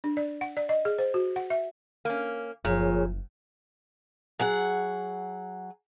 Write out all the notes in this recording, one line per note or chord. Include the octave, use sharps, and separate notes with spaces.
D4
D5
F#5
D5
D#5
G#4
C5
F#4
F#5
E5
A#3 C#4
F#1 A#2 F3 G#4 C#5
F#3 G#4 F#5